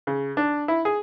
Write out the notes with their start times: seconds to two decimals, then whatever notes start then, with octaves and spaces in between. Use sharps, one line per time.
0.07 C#3
0.37 D4
0.68 E4
0.85 G#4